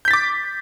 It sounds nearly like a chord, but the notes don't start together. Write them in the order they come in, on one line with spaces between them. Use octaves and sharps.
G6 B6 A6 D6